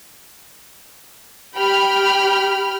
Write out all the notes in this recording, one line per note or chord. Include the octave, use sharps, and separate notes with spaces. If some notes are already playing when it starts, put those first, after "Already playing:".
G4 G5 B5 F6